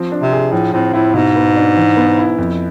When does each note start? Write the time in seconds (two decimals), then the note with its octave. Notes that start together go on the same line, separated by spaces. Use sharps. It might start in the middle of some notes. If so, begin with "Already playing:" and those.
Already playing: F3 C4
0.12 D4
0.22 C3
0.32 G#4
0.52 A2 F3
0.73 A2 C4
0.93 A2 E4
1.14 G#2 B2
1.36 B3
1.56 D4
1.77 E3
1.97 B3
2.18 E4
2.38 F2